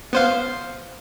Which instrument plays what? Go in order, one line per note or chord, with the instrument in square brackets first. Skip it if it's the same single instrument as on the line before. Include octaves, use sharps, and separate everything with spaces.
[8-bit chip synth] B3 C5 F5